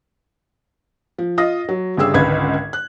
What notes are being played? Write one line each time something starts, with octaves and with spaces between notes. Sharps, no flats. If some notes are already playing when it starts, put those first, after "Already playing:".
F3
F4 D#5 D#6 A#6
F#3
G1 C#3 G3 G4 G#4 E6
G#1 C#2 D3 B4 B5 G#6
F#6